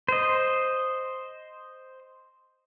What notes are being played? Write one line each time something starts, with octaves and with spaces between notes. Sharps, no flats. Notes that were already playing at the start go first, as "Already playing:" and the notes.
C5 D#5